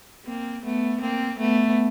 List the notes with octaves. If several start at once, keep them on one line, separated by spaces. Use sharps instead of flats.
A#3 C4
A3 B3
A#3 C4
A3 B3